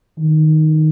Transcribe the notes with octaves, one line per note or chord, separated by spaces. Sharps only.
D#3